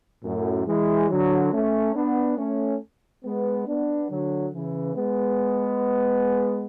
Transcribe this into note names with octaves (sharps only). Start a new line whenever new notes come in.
F#2 A2
E3 G#3
D3 F#3
A3 C#4
B3 D4
A3 C#4
G#3 B3
B3 D4
D3 F#3
C#3 E3
G#3 B3